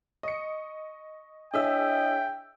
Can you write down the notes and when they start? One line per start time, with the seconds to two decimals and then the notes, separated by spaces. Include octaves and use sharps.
0.23 D#5 C#6 C#7
1.54 D4 E4 G#4 C#5 D#5 E5 G5 E6